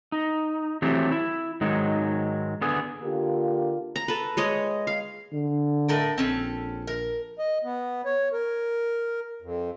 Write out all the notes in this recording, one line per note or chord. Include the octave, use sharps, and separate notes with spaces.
D#4
E3 F#3 A3 C4 G4
E4
G#2 D#3 F#3 G#3
D3 B3 G#4
D3 A#3 D4 F4 G4
A#5
A4 B4
G#3 C#5 D#5
F5
D3
A2 A4 A#4
A#1 C4 C#4 A4
A#4
D#5
B3
C#5
A#4
F2